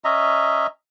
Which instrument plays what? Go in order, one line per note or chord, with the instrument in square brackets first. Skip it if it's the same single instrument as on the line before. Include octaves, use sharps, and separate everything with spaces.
[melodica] C#4 D#5 E5 A#5